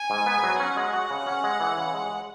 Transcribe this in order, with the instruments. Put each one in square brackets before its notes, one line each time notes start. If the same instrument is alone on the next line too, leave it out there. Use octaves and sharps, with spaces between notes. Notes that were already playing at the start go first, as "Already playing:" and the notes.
Already playing: [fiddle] G#5
[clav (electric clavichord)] G#2
B3
F#3
[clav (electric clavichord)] C#4 [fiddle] F#5
[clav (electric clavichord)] G#3
F#4
C#3
C#4
G#3
E3
C#3
G#3